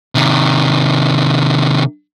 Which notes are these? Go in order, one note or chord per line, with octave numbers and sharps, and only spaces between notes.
C3 D#3